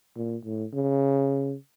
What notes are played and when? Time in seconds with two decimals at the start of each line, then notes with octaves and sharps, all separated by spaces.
0.16 A#2
0.45 A2
0.74 C#3